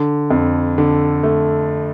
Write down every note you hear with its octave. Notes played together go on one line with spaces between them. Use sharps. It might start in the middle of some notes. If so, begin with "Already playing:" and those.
Already playing: D3
F2
D3
A3